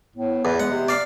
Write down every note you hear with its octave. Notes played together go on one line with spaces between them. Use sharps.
A2 B3
E2 B4
G#3 F#5
C3
D5 F5